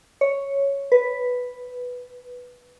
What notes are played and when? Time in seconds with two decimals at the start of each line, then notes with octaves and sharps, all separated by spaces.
0.21 C#5
0.92 B4